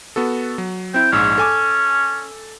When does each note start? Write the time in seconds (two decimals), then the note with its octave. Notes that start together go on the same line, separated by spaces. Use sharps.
0.16 B3 F#4 A4
0.58 F#3
0.94 C4 E4 G5
1.12 A#1 G#2 C#4 E6
1.38 A4 G#5 D6